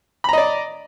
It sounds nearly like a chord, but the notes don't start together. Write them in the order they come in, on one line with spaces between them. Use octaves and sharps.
B5 A#5 D#5 D5